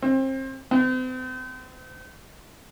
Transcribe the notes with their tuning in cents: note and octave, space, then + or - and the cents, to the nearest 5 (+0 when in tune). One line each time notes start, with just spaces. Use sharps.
C4 +30
C4 -40